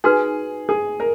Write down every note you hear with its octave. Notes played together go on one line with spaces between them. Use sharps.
D#4 F#4 G#4 B4
G#4
A#4